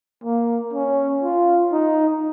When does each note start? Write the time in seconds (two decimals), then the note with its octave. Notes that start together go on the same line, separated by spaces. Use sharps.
0.24 A#3
0.73 C#4
1.23 F4
1.72 D#4